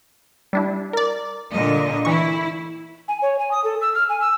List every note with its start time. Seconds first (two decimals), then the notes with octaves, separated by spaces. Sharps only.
0.53 G3 D4 E4
0.93 A#4 D5
1.52 A#2 D3 D#5
2.05 E3 E4 C#6
3.08 G#5
3.22 C#5
3.39 G#5
3.51 D#6
3.64 A4
3.81 E6
3.95 F6
4.09 G#5
4.21 E6